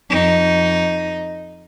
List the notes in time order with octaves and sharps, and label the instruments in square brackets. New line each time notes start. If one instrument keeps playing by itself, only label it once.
[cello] F2 D#4